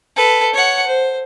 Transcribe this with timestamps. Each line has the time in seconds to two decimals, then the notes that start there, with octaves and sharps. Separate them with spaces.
0.16 A4 B4
0.54 C#5 F#5
0.87 C5